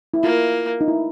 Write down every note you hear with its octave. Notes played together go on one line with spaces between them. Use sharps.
E4
A#3 F4
D#4
E4